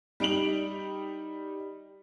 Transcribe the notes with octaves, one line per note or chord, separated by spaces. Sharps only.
G3 D#4 D7 F7 F#7